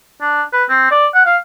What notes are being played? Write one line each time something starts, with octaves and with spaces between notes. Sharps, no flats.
D4
B4
C4
D5
F#5
F5